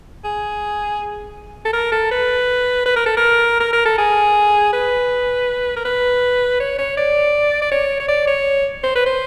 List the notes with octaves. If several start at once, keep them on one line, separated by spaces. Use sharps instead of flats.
G#4
A4
A#4
A4
B4
B4
A#4
A4
A#4
A#4
A#4
A4
G#4
B4
A#4
B4
C#5
C#5
D5
D5
C#5
C#5
D5
C#5
C5
B4
C5